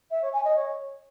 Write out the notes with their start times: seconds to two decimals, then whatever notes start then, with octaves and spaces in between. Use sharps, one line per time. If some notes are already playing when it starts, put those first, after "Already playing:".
0.10 E5
0.21 C#5
0.33 G#5
0.44 D#5
0.55 C#5